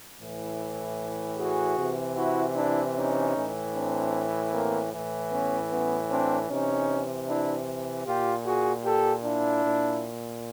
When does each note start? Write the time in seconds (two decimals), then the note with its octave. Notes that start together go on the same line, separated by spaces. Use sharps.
0.19 A2 E3
1.37 F#4 G#4
1.77 C3 E3
2.16 E4 F#4
2.55 D4 E4
2.95 C#4 D#4
3.35 A2 E3
3.74 C4 D4
4.52 A#3 C4
4.92 A2 E3
5.31 B3 C#4
5.70 B3 C#4
6.10 C4 D4
6.49 C3 E3 C#4 D#4
7.28 D4 E4
8.06 A#2 F4 G4
8.46 F#4 G#4
8.84 G4 A4
9.24 D4 E4
9.64 A#2